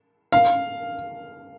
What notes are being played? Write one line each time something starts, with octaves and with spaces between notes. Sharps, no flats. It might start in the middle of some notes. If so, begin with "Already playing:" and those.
F5